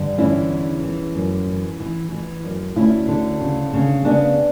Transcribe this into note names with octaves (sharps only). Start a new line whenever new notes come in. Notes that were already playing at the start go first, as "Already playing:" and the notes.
Already playing: G2 D3
E3 C#4 E4
E2
E3
F#2
E3
E3
E3
F#2
D2 C#4 E4
D3
C#3
C#3
C#3 B3 D4